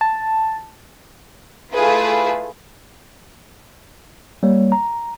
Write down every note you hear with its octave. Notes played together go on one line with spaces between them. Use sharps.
A5
A3 E4 F4 G#4 B4
G3 A#3 C#5
A#5